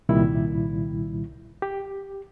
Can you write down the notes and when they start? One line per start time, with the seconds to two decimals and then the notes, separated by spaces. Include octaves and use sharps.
0.09 C2 A#2 D#3 G3 E4
1.62 G4